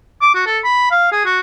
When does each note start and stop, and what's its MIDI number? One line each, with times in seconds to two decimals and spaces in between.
0.21 0.30 86
0.34 0.43 66
0.46 0.59 69
0.64 0.87 83
0.91 1.07 77
1.12 1.24 68
1.25 1.40 66